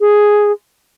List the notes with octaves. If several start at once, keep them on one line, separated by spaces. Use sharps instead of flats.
G#4